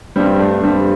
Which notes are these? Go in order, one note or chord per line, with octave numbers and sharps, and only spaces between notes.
G2 G3 C4
A3 D4
G2 G3 C4